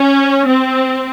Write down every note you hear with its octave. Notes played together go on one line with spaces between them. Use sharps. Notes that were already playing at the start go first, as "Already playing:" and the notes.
Already playing: C#4
C4